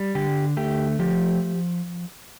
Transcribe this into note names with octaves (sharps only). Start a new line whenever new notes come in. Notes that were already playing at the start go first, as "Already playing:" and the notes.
Already playing: G3
D3 G4
A3 G4
F3 G4